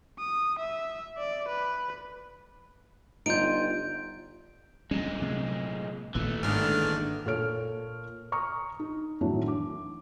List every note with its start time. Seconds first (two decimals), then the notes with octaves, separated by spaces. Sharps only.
0.19 D#6
0.59 E5
1.18 D5
1.48 B4
3.26 G1 D#4 F4 G6 D7
4.91 D2 A#2 G3 G#3 C#4
5.22 C3 F#3 A3
6.15 D#1 G#1 A#2 E3 A3
6.43 G#2 D3 D#3 D4 F6
7.26 A#2 A4 C#5 F6 D7
8.32 A#5 C#6 D#6 F6
8.79 D#4
9.21 A2 D#3 E3 F#3 D4 F#4
9.48 D6